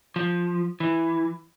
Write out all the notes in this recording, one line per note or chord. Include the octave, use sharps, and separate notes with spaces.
F3
E3